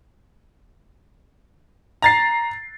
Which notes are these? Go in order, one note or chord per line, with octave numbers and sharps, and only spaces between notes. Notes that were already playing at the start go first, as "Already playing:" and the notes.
A#5 A6 C7